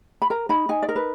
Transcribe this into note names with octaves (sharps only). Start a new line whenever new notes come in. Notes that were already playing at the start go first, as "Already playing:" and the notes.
B5
A#4 A#5
D#4 B5
D#4 G#5
D5
A#4
B4